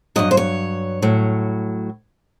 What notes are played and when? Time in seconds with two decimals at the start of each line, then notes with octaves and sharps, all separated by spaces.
0.16 G2 D#3 F#3 D#5
0.31 C5
0.37 C#5
1.02 A2 F#3